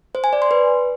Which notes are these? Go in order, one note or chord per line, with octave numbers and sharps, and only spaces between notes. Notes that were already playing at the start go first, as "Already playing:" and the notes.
C5
G#5
D5
C6
B4